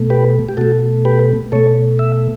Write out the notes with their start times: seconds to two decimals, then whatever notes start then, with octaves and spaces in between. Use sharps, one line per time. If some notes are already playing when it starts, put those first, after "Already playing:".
Already playing: B2 A3
0.10 G4 B4
0.49 G4
0.57 B2 A3 F#4 A4
1.05 G4 B4
1.52 B2 A3 A4 C#5
1.99 E5